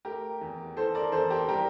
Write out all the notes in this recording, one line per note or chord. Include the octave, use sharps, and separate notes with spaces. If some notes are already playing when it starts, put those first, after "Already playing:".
A3 G4 A#4
E2
E3 A4 C5
A#4 D5
E2 A4 C5
G4 A#4
G3 G4 A#4